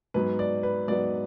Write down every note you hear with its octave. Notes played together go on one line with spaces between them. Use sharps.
G#2 F#3 B3 B4
D5
B4
G#2 F#3 B3 D5